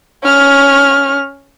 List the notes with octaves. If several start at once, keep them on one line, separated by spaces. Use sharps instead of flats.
C#4 F6